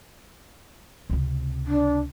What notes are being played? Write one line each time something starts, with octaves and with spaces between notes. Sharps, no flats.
C#2 C3
D4